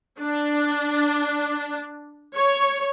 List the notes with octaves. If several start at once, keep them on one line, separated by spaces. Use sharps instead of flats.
D4
C#5